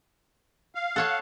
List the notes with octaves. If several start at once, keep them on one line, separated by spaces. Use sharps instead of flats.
F5
A4 C#5 F#5 A5